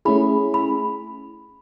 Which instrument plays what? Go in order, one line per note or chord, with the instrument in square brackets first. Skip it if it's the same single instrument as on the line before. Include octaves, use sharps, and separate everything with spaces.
[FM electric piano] A3 C#4 E4 G#4 [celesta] B5
[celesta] B5